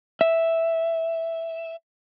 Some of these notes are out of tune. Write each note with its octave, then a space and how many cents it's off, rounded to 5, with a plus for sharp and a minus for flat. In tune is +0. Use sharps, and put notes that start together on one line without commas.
E5 +0